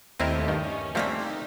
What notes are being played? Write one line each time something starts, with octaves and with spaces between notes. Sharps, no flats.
D#2 A3 C4 E4 G4 A#4 D#5
G2 D#3
C#4
E3 F3 G3 A3 A#3 C4
D#4